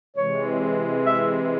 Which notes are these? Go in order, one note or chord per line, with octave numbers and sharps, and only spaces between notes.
C3 E3 G#3 C#5
E5